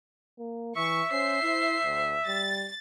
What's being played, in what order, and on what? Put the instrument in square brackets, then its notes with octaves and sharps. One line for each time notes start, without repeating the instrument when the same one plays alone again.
[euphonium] A#3
[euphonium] E3 [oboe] E5 [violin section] C#6
[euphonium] C#4 [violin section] C5 C7
[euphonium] E4
D2
[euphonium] G3 [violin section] A6